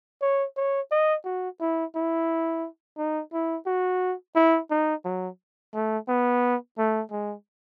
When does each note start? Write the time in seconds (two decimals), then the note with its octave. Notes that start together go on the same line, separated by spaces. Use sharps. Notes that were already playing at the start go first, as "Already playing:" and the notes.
0.22 C#5
0.57 C#5
0.91 D#5
1.25 F#4
1.61 E4
1.95 E4
2.98 D#4
3.33 E4
3.67 F#4
4.36 E4
4.71 D#4
5.05 F#3
5.74 A3
6.08 B3
6.78 A3
7.12 G#3